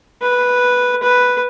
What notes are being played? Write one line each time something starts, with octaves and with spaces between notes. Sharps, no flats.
B4
B4